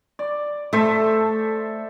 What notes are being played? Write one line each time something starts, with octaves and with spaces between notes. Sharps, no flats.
D5
A3 A4 C5 E5